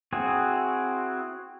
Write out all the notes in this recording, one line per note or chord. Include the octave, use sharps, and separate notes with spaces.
C4 E4 F#4 G#4